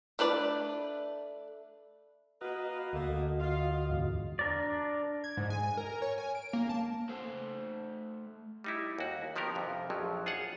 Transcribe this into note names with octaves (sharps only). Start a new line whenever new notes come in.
A3 D4 B4 D5
A#3 F#4 A#4 B4 D#5
D2 A3 A#3
F4 F5
E2 G#2 D3
D4 A#4 D5
G#6
G#2
G#5
G#5
A#4
A#4
C#5
G#5
D7
A#3
A5
A3 C5
G3 D#4 E4
D#2 F#4
D#3 F3 B3 G4 A#4
F2 C3
A#1 F2 F3 F#3
F4 G#4 C#5 F#5